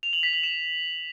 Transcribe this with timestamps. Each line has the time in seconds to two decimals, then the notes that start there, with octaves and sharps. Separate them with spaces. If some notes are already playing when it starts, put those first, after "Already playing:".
0.03 F7
0.13 F#7
0.23 B6
0.33 F#7
0.43 E7